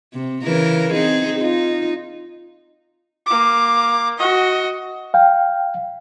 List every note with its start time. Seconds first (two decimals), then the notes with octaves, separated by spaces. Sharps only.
0.14 C3
0.44 C#3 E3 A#4
0.94 C4 D#4 G#4
1.40 D#4 F4
3.26 A#3 D6
4.18 F#4 D#5
5.14 F5 G5